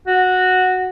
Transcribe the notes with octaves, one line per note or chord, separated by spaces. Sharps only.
F#4